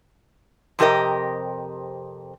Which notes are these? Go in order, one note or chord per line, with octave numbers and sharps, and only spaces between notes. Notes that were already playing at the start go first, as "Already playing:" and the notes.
F2 C3 G4 A#4 D#5